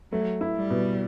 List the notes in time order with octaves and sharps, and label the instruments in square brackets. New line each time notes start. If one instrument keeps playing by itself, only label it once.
[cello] F#3 [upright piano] A3
[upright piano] E4
[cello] G3
[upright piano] B2